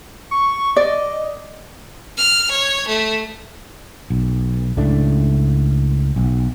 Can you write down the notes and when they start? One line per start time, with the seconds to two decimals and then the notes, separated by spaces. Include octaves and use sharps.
0.31 C#6
0.76 D5 D#5
2.17 F6
2.50 C#5
2.88 A3
4.10 B1
4.77 C#2 A2 A3 D4
6.16 B1